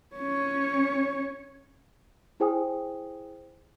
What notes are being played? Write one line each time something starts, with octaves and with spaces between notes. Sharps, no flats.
C#4 C#5
E4 G#4 C5 G5 G#5 D#6